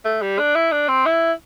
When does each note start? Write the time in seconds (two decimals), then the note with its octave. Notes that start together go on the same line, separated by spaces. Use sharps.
0.05 A3
0.22 G3
0.39 D4
0.55 E4
0.72 D4
0.89 C4
1.06 E4